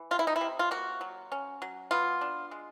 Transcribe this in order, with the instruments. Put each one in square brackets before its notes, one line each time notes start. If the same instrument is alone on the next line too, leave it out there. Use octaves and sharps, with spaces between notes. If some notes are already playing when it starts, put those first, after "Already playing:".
Already playing: [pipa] E3
C3 F4
E4
D#4
E4
C3
F4
A#3 F#4
F#3
C#4
F#3
B3 F4
D4
G#3